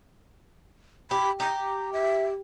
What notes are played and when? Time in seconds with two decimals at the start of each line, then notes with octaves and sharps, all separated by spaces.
1.11 G4 B5
1.40 G4 A#5
1.93 E5